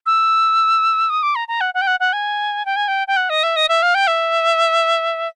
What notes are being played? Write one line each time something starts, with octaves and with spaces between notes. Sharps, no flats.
E6
D#6
D6
A#5
A#5
F#5
F#5
G5
F#5
F#5
G#5
G5
G#5
G5
G5
F#5
D#5
E5
D#5
E5
F5
G5
E5